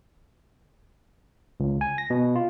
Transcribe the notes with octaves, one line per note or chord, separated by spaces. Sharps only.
C#2
G#5
A#6
B2
F4